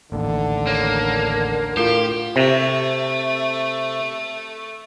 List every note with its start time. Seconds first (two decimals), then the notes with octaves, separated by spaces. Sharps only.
0.12 A1 D#2 D3
0.67 A#3 C#5
1.77 A2 F4 G4 A#4
2.36 C3 A3